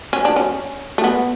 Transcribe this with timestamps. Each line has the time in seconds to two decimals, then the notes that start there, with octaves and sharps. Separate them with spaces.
0.13 C#4
0.25 D4
0.36 C#4
0.98 A3
1.04 B3